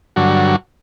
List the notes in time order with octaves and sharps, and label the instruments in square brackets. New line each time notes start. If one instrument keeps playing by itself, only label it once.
[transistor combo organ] G2 D3 F#3 F#4